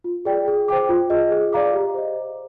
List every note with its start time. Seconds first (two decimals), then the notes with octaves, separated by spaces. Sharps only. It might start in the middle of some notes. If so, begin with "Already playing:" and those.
0.04 F4
0.25 G#4 D5 G5
0.48 G#4
0.68 C5 G5 D6
0.89 F4
1.10 G#4 D#5
1.31 G#4
1.53 D5 F5 A#5 D6
1.73 G4
1.94 C5 D#5
2.15 C5